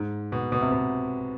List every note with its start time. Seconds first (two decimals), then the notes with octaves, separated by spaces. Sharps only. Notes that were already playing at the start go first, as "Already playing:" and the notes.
Already playing: G#2
0.32 B2
0.52 B2
0.61 C3
0.72 B2